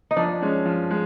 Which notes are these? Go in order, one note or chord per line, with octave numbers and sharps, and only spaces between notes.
D#4
F3 D4
G#3 C#4
F3
G#3